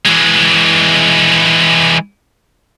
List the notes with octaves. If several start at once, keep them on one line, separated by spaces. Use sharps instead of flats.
E3 G#3